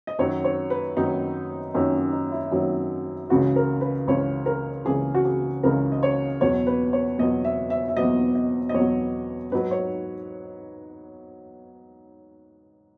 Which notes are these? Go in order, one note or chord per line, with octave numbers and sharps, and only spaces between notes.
D#5
F#2 D#3 F#3 C#5
C#5
B4
F#2 D#3 F#3 D#4
F#2 D#3 F#3 C#4
D#4
E4
F#2 D#3 F#3
C#2 C#3 E3 F#4
A#4
B4
C#2 C#3 E3 C#5
A#4
C#2 C#3 E3 G#4
F#4
G#4
C#2 C#3 E3 A#4
D#5
C#5
E2 B2 F#3 C#5
B4
C#5
E2 B2 F#3 D#5
E5
E5
E5
E2 B2 F#3 D#5
D#5
D#5
E2 B2 F#3 C#5
G#2 F#3 B4
C#5